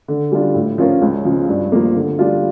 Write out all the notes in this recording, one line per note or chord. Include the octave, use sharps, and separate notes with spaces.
D3
G3 D4 F4
A2
F3 C#4 F4 A#4
C#2
C#3 F3
G2
F3 A#3
D3
G3 D4 F4